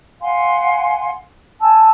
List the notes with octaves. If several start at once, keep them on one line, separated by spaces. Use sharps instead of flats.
F5 F#5 G#5 C6
G#5 A5 E6